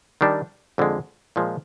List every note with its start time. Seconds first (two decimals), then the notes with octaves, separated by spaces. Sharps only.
0.21 D#3 G3 D4
0.78 F2 D3 G#3
1.36 A#2 F3 G#3